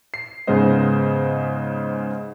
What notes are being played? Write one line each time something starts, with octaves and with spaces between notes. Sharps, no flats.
C7
G#2 C#3 G#3 B3 C5 D#5